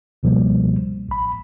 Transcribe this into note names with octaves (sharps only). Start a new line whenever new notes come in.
C#2 B2 F3 G3 A#3
A1 B5